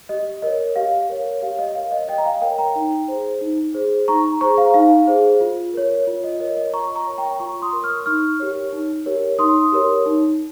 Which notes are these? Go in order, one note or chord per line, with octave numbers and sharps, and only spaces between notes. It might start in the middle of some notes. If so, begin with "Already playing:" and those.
G4 D#5
A#4 C#5 D#5
G4 F5
A#4 C#5
G4 F5
D#5
A#4 C#5 F5
D#5
G4 D#5 G5
A#5
F5 G#5
A#4 C#5 G5 A#5
G5 A#5
D#4
G#4 C5
D#4
G#4 C5
D#4 A#5 C#6
G#4 C5 A#5 C#6
F5
D#4 F5
G#4 C5
F4
A#4 C#5
F4
D#5
A#4 C#5 D#5
D#5
F4 A#5 C#6
A#5 C#6
A#4 C#5
G5 A#5
F4 A#5 C#6
C6 D#6
A#4 C#5
C#6 F6
D#4 C#6 F6
G4 A#4 C#5
D#4
G4 A#4 C#5
D#4 C6 D#6
G4 A#4 C#5
D#4